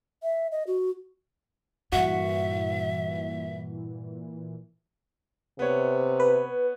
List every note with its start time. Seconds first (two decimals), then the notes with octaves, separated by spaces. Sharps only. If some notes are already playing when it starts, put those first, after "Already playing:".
0.23 E5
0.52 D#5
0.67 F#4
1.92 G2 A#2 E3 F#4 E5
5.59 C3 B3 C#5
6.20 B4